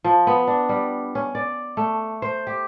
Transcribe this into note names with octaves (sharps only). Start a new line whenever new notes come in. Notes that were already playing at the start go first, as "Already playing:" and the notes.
F3
B3
D4
G3
C#4
D5
A3
C5
G4